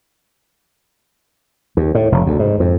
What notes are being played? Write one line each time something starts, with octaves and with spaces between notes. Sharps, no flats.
D#2
A2
F1
D2
G#2
F2